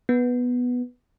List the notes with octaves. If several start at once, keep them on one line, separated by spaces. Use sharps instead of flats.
B3